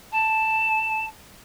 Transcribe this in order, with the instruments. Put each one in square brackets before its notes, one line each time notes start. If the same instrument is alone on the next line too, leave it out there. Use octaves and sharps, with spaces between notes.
[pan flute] A5